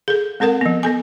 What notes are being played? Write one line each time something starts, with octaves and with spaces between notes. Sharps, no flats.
G#4 A4
G#3 C4 A4 A#4 F#5
F3 B3
B3 A4 G#5